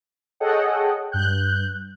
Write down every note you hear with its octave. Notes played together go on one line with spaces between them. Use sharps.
G#4 A4 C#5 D#5 F#5 G5
G2 F#6 G6